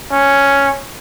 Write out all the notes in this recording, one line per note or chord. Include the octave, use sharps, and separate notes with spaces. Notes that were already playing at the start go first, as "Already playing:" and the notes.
C#4